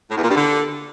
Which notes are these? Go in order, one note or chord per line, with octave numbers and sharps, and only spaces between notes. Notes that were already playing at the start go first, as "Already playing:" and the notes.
A2
E2
A#2
G2
D3